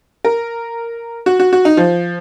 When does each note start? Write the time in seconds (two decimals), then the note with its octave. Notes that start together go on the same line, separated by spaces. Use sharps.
0.25 A#4
1.26 F#4
1.40 F#4
1.53 F#4
1.65 D#4
1.77 F3